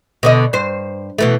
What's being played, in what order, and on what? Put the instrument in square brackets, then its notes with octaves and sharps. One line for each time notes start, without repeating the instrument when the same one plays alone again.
[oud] B2 D3 D#5
G2 C5
B2 E3 A3